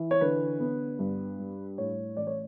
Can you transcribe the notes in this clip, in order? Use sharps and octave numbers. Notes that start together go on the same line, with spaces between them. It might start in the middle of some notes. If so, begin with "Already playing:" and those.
Already playing: E3
C#5
D3 B4
B3
G2
G3
A2 C#5
A1 D5
C#5